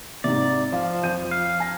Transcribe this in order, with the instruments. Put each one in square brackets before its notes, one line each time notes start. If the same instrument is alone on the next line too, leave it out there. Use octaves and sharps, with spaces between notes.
[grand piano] G#2 C3 [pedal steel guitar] D5
[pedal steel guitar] F3 [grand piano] F5
[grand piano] F2 G6 D#7
[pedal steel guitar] F5
[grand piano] G#5 A#6